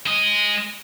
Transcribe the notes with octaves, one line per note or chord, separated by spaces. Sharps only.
G#3 D#5